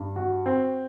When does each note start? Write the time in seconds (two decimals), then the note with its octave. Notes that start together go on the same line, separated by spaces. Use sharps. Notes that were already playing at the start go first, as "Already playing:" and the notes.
Already playing: G2
0.16 F#4
0.46 C4